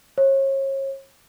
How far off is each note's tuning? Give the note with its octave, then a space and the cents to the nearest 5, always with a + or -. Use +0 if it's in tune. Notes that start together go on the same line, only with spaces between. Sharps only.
C#5 -35